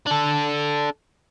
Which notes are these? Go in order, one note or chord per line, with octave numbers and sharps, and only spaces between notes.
D4 A4